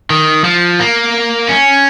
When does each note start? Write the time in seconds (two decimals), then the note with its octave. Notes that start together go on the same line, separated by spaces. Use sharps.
0.10 D#3
0.44 F3
0.80 A#3
1.49 C#4